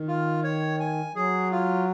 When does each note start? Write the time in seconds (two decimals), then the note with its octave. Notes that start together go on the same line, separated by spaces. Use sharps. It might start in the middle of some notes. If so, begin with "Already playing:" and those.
Already playing: D#3
0.08 F4
0.44 C#5
0.80 G#5
1.15 F#3 G#4
1.52 F4